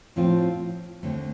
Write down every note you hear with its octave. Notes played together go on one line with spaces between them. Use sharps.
A2 F3 C4 F4
D#2 D3 A3 C4